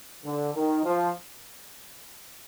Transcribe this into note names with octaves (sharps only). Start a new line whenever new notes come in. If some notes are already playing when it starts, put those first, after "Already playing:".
D3
D#3
F3